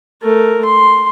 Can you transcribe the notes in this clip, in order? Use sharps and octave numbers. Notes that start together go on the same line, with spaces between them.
A3 A#4
C6